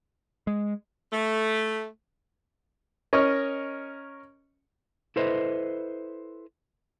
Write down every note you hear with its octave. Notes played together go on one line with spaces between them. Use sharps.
G#3
A3
C#4 A#4 C#5 D#5 C#6
E4 A4 B4 C5 D#5 E5